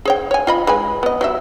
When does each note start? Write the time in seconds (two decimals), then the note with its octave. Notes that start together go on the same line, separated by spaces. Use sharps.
0.05 G#4 C#5 G5
0.31 C#5 G#5
0.47 F4 D#5 B5
0.67 G#3 B4 G#5
1.03 B3 D#5
1.21 F#3 G3 E5